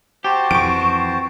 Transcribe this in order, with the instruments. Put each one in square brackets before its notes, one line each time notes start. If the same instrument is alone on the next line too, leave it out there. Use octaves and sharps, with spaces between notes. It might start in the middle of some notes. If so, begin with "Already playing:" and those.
[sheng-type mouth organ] F#4 C5 A5 [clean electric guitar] G4
[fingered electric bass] F2 E3 [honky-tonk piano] C#6 D7